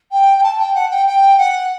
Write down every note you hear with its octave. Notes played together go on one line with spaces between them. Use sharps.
G5
G5
A5
G5
F#5
G5
G5
F#5